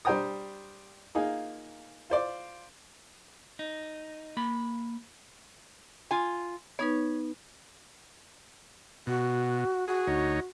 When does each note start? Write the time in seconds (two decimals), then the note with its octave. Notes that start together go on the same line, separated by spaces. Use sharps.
0.05 G3 D4 C5 G5 A#5 D#6
1.15 A#3 D#4 F4 G#4
2.10 F4 C5 D5
3.59 D#4
4.37 A#3 B5
6.11 F4 G#5
6.79 B3 D#4 B4 C#5
9.07 B2 F#4
9.88 F#4 G#4
10.07 D2 D#4 C#5